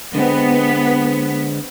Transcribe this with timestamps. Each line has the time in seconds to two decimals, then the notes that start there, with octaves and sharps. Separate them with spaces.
0.15 D3 G#3 B3 C4